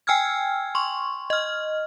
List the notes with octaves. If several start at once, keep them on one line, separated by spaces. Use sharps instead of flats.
G5 G#5 E6 F6 G#6
C6 C#6
D#5 F6